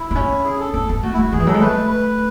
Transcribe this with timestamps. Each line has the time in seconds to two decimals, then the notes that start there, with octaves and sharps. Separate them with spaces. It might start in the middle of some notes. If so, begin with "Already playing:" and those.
Already playing: E4
0.11 B3
0.15 C#4
0.45 G#4
0.59 A4
0.74 B3 A4
0.89 B3
1.03 A3 F#4
1.13 E4
1.18 G#3 F#4
1.32 D#3 G#4
1.40 E3
1.47 F#3 A4
1.54 G#3
1.61 A3 B4
1.91 B4